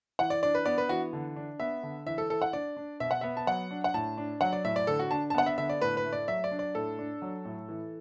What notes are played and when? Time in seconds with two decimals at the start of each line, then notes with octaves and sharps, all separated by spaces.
0.19 E3 F#5
0.30 D5
0.43 D4 D5
0.55 B4
0.65 B3 D5
0.78 B4
0.89 E3 F#4
1.13 D3
1.36 D4
1.60 B3 E5
1.83 D3
2.06 E3 E5
2.18 A4
2.30 E3 A4
2.42 F#5
2.53 D4 D5
2.77 D4
3.00 B2 E5
3.11 F#5
3.21 B3 E5
3.37 A5
3.47 F#3 F#5
3.71 D4
3.84 F#5
3.94 A2 A5
4.18 D4
4.41 F#3 F#5
4.53 D5
4.64 A2 E5
4.76 D5
4.87 D3 A4
4.99 F#4
5.11 D4 A5
5.30 A5
5.34 B3 F#5
5.46 E5
5.58 D3 E5
5.69 D5
5.81 A2 B4
5.97 B4
6.05 A3
6.13 D5
6.28 F#3 E5
6.44 D5
6.51 D4
6.59 D5
6.75 A2 A4
6.99 D4
7.22 F#3
7.45 A2
7.69 E3